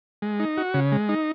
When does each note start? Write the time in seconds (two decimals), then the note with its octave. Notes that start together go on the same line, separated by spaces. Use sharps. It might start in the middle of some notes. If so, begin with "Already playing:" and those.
0.22 G#3
0.40 D#4
0.57 F#4
0.74 C#3
0.92 G#3
1.09 D#4